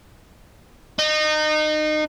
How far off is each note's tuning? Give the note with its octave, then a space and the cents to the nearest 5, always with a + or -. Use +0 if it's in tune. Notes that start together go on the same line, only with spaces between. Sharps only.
D#4 -25